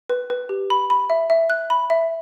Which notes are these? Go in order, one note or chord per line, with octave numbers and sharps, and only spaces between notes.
B4
B4
G4
B5
B5
E5
E5
F#6
B5
E5